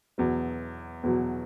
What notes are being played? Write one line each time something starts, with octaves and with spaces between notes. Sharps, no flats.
E2 B2 F#3
E2 B2 F#3